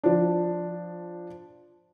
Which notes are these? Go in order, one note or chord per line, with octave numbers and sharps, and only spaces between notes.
F3 D4